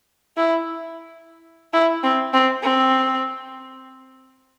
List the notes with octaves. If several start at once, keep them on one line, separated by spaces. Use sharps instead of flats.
E4
E4
C4
C4
C4